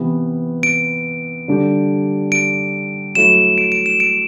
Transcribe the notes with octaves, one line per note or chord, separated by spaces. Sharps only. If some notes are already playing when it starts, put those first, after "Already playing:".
Already playing: C3 E3 B3
D7
D3 G3 D4 G4
D7
F#3 A3 E4 E7
D7
D7
E7
D7